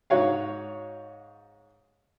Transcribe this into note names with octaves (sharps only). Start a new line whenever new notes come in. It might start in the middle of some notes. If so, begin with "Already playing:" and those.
G#2 F#4 C#5 F5